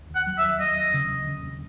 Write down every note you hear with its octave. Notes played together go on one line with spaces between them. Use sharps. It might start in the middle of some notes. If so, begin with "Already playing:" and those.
Already playing: D#2
D#2 F#5
F#3
E5
D#2
F#3 D#5
D#2
C#3
D#2
C#3
D#2